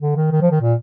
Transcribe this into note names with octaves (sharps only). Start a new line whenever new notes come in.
D3
D#3
D#3
F3
D#3
A#2